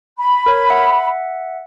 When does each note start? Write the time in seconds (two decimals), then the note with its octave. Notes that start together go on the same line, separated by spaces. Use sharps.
0.18 B5
0.46 A#4 C#5
0.70 E5 F#5